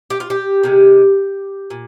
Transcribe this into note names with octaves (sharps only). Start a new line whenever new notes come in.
G4
F4
G4
C3 D#3 G#3
A#2